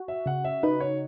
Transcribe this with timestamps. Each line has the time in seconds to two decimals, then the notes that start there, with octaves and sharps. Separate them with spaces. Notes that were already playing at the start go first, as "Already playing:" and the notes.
Already playing: F#4
0.08 E5
0.26 C#3 F#5
0.44 E5
0.63 D#4 B4
0.80 C#5